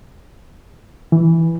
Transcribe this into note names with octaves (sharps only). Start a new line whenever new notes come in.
E3